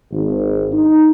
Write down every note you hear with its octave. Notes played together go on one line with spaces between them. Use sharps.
G#1
D#4